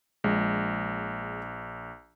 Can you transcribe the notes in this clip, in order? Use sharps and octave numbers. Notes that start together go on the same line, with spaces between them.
A#1 G#3